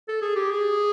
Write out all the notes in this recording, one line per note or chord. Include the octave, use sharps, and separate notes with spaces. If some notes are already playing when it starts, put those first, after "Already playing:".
A4
G#4
G4
G#4